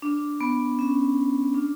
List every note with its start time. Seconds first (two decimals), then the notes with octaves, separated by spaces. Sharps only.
0.02 D4
0.41 B3
0.79 C#4
1.55 D4